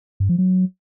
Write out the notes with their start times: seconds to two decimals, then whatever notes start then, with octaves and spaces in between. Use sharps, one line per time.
0.20 G2
0.29 F3
0.38 F#3